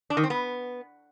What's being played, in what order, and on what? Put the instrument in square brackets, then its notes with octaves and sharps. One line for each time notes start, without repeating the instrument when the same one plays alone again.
[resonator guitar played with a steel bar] D4
D#3
C4
B3